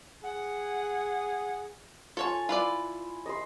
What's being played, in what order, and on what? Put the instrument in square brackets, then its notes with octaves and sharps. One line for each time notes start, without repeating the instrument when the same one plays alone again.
[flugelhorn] G#4 [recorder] F#5
[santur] F4 G#5 [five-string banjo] A4 C#5 A5
[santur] E4 [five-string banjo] F4 B4 D5
[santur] D#5 B5 C6